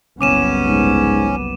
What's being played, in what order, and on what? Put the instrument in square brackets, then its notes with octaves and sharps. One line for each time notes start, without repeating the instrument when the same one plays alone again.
[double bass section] F#1 C2 B3 [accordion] C#4 [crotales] D6 D#7 E7
[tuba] G#2